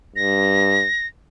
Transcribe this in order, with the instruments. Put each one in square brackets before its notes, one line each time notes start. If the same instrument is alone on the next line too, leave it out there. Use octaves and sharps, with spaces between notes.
[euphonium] G2 [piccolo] A#6